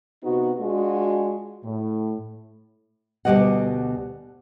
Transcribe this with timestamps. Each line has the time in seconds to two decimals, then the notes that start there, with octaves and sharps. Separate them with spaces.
0.23 C3 B3 D#4 F#4
0.57 G#3 D4 F4 F#4
1.64 A2
3.25 D2 B2 F3 G3 D#5 F#5